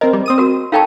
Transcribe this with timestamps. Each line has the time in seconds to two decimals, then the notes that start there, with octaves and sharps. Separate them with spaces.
0.01 C4 A#4 D#5
0.13 G3
0.26 C4 D#6 D#7
0.38 F#4 A#4
0.72 D#4 A4 C#5 F5 G5 A5